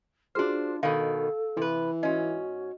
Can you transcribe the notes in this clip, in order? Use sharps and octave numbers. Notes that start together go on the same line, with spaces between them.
D4 F4 F#4 G#4 C5 F6
B2 D#3 A4 F5
C3 E3 B4
G#2 C#4 F#4 D#5